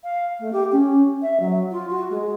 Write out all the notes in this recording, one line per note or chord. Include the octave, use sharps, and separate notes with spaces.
F5
A3
G4
C#4
E5
F#3
F4
F#4
G#3